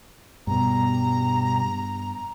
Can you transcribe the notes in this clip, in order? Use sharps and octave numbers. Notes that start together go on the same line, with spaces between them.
G2 B2 G3 B3 A#5